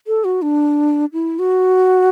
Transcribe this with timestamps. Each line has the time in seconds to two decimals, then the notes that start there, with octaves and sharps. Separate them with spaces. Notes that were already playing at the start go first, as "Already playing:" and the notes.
0.07 A4
0.24 F#4
0.42 D4
1.13 E4
1.39 F#4